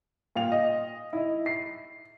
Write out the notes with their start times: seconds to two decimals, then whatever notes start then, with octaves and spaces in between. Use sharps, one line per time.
0.36 A#2 F5 G5 F7
0.52 D#5
1.13 E4 D#5
1.46 C7